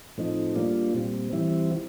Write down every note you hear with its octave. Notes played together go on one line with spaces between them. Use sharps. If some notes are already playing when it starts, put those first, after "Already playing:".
A2 F3 A3 C4 D#4
G3 A#3 D4 F4
A#2 G3 C4
E3 G3 C4 E4